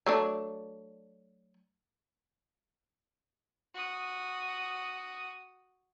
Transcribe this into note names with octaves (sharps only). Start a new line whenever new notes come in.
F#3 A3 D4
F#4 D#6